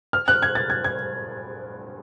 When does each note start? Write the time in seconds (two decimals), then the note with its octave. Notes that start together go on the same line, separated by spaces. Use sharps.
0.13 F6
0.28 F#6
0.42 G#6
0.55 A6
0.70 G#6
0.84 G#6